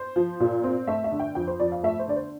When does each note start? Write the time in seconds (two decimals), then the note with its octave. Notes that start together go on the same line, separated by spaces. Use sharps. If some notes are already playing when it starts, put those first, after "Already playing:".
Already playing: C5
0.16 F3
0.40 A#2
0.64 C4
0.87 A3 E5
1.04 E5
1.12 D3
1.20 G5
1.35 F2 G5
1.47 C5
1.60 F2 D5
1.72 F5
1.83 A3 E5
1.99 C5
2.08 D3 D5
2.16 C5